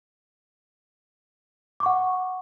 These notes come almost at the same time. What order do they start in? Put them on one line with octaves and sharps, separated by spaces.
D6 C#6 F#5